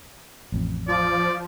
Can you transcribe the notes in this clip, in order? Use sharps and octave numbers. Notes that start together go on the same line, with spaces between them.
A1 F2
F3 D5